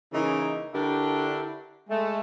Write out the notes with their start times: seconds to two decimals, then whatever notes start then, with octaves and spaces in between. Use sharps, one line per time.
0.13 C#3 E3 A#3 D#4
0.73 D3 D4 E4 F#4 G4 A#4
1.89 G#3 A3